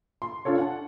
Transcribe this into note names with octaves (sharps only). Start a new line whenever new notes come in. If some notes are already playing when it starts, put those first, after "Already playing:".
C6
D4 F4 A4 C#5
F#5 A5